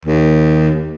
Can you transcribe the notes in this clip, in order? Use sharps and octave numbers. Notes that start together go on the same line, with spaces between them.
D#2